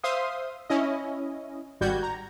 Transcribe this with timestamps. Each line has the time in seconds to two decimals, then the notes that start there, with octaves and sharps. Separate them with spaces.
0.04 C5 E5 F5 C6 D#6
0.70 C#4 E4 D#5
1.81 G#1 G3 F#4 G6 G#6
2.03 A#5